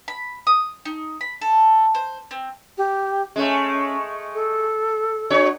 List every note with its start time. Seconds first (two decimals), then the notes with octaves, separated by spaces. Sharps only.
0.08 B5
0.47 D#6
0.85 D#4
1.21 B5
1.42 A4
1.95 C5
2.31 C4
2.78 G4
3.36 G#3 A3 C#4
4.35 A4
5.30 D4 F#4 C#5